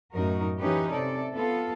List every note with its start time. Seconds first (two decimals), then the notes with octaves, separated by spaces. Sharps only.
0.14 F#2 A2 D#4 F#4 A#4
0.58 E3 C#4 D#4 G4 B4
0.91 C3 A4 D5
1.34 B3 F4 A4